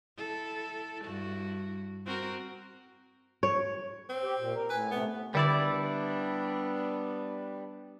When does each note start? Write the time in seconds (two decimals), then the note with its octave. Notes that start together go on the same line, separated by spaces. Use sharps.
0.18 E4 A4
1.04 G2 E4 F#4
2.06 C4 F#4 A#4
3.43 C#5
4.09 C4
4.23 G4
4.38 A#2
4.55 A#4
4.70 A2 B4 G#5
4.91 C3 A3 B3
5.35 D3 G3 B3 D4 E4 D5